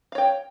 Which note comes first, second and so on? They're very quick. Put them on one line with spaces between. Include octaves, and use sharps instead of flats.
F5 C#5 G5